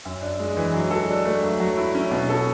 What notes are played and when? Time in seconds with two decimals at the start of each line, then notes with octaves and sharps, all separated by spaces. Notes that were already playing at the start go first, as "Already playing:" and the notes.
0.05 F#2
0.21 D4
0.40 G#3
0.57 E3
0.74 F#3
0.91 A4
1.09 D4
1.25 A3
1.43 F#3
1.60 F#3
1.77 E4
1.95 C#4
2.11 B2
2.29 A4